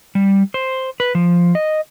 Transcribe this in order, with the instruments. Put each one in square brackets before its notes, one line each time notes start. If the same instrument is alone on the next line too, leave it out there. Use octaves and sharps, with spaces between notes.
[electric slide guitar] G3
C5
B4
F3
D#5